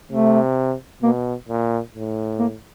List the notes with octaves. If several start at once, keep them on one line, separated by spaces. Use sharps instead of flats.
C3 A3
B2 A#3
A#2
A2
A#3